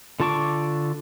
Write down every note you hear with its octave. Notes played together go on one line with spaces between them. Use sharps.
D3 F4 A5 C#6 D6